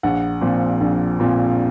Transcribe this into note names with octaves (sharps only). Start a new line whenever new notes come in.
A#1 F#5
A#2 F3 C4
A#1
A#2 F3 C4